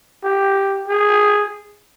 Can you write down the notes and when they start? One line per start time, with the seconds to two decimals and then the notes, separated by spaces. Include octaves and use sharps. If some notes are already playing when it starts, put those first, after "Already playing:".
0.24 G4
0.88 G#4